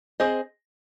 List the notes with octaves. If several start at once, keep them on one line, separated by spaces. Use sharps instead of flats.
C4 G#4 C5 D#5